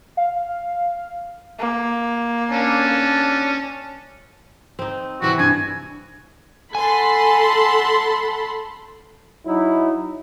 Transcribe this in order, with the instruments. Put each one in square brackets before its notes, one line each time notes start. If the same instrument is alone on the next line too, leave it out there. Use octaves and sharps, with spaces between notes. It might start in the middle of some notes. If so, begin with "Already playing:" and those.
[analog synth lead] F5
[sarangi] A#3
[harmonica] C#4 D4 A5
[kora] C4 D#4
[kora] C3 E3 G3 [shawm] F#4
[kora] G2 [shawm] G#5
[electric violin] A4 B5 [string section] F#5 A5 C6 [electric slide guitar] G#5
[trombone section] F#3 D#4 E4